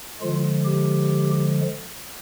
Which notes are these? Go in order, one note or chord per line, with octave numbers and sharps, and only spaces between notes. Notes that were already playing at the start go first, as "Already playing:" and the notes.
D3 F3 G#3 F4
G4